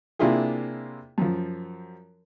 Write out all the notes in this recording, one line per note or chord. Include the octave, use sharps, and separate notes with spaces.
C3 A#3 D4 E4 F4 G#4
F#2 F3